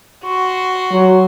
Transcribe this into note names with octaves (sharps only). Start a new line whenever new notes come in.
F#4 C6
F#3